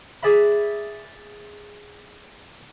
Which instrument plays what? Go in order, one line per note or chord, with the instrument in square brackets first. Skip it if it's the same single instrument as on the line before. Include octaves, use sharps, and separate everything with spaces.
[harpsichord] G#4 D5 E5 B5